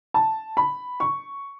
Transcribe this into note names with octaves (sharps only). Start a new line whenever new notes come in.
A5
B5
C#6